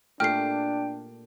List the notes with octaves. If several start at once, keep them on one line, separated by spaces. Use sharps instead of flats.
A#2 A3 D4 G4 G5 F6 C7